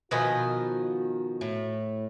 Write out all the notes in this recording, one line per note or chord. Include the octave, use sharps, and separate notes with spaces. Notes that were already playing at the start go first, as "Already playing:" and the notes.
B2 D#3 F3 F#4 B4 D#5 G#5
A2